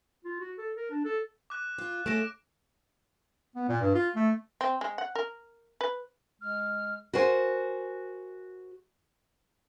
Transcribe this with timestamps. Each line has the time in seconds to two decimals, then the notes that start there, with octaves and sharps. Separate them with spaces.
0.25 F4
0.40 F#4
0.58 A4
0.77 A#4
0.90 D4
1.05 A4
1.50 D6 F#6
1.78 F4
2.06 C#3 A3 A#6 D7 E7
3.56 B3
3.69 A#2
3.81 G2
3.95 F4
4.16 A3
4.61 C4
4.81 G#3
4.98 F#5
5.15 A#4
5.81 B4
6.42 G#3 F6
7.13 F#4 A#4 C5 G#5